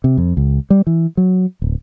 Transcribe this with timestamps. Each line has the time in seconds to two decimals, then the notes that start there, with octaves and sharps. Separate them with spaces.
0.04 C3
0.18 F2
0.37 C#2
0.70 G3
0.87 E3
1.17 F#3
1.62 D1